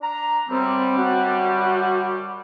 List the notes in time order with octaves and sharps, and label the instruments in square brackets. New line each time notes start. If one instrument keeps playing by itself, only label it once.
[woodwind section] D4 A#5
[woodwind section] F#2 D3 G3 [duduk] C4
[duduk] F#4